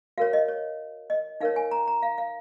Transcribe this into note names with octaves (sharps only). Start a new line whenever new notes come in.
F#4 A#4 C#5 F5
D#5
C#5
D#5
D#4 A#4 C#5 F5
G#5
A#5
A#5
F5
F5